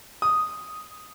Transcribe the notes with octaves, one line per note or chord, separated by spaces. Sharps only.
D#6